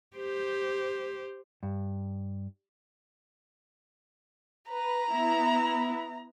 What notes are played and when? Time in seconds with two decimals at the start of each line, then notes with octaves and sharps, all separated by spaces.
0.16 G4 C5
1.63 G2
4.69 B4 A#5
5.11 B3 E4